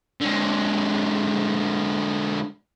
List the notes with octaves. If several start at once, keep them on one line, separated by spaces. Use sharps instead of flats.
D3 G#3